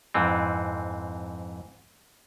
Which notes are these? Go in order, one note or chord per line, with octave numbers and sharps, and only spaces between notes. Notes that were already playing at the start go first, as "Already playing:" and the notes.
F2 G#2 E3 C4